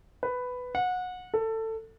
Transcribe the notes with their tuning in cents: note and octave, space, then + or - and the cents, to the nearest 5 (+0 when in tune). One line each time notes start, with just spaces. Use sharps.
B4 +10
F#5 -25
A4 +20